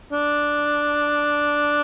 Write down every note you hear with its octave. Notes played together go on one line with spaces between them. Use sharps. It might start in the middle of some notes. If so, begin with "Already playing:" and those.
D4